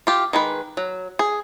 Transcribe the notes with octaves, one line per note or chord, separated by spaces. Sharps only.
F4 G4
D#3 G#3 B4
F#3
G#4